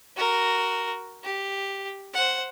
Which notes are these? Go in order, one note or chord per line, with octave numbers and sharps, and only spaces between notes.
F#4 A#4
G4
C5 F#5